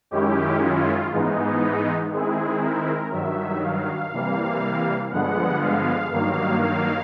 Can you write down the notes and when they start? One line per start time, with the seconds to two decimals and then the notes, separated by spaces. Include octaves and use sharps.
0.11 F#2 D#3 G#3 C#4 E4 G4
0.61 F4
1.12 G#2 E3 G#3 B3 D#4
2.11 D#3 G#3 C4 E4 G#4
2.61 A#4
3.11 G2 D#3 F#3 E5
3.61 F5
4.11 C3 E3 G3 A#3
5.11 G2 D3 F3 G#3 B3 F#5
5.61 F5
6.11 G2 D#3 F#3 A#3 F5
6.62 F5